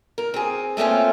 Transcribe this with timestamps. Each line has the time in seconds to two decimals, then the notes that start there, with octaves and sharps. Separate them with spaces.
0.18 A#4
0.34 C4 G#4
0.77 A3 A#3 C4 C#4 F4